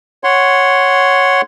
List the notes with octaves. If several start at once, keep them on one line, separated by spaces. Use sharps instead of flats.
C#5 F#5 C6